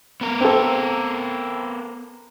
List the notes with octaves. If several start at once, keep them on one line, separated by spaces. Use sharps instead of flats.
B3 A#4
C4 A4